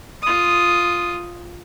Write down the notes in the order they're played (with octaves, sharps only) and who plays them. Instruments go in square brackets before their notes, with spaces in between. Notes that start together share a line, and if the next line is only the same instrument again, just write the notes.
[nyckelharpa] F4 D#6